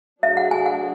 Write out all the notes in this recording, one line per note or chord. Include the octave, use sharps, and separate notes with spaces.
F#3 A3 D4 G#4 E5
F#5
G#5
F#5